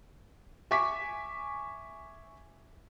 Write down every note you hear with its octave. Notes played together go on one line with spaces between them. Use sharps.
E5 G#5 C#6 D6 B6